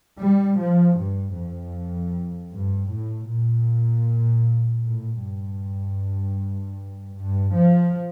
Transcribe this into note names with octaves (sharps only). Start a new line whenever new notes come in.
G3
F3
G2
F2
G2
A2
A#2
A2
G2
G2
F3